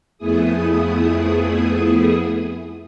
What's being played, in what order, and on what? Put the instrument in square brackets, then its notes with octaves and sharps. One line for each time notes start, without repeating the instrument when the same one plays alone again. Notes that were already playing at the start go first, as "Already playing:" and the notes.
[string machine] F2 A3 B3 E4 G#4 D#6